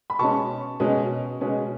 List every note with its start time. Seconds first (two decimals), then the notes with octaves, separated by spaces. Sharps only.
0.10 B5
0.19 B2 G#3 C#4 A5 C#6
0.80 B2 G#3 C#4
1.41 B2 G#3 C#4